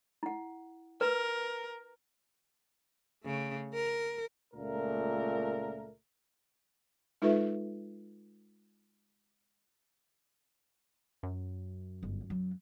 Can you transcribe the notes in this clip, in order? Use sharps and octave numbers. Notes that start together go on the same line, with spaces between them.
E4 F#5
A#4 B4
C#3 A3
A#4
C#2 A#2 A3 A#3 A#4
G#3 D#4 F4 A4 B4 E5
F#2
G1
F#3